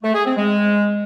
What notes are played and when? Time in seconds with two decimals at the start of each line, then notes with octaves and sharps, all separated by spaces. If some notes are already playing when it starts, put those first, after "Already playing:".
0.03 A3
0.14 G#4
0.25 C4
0.36 G#3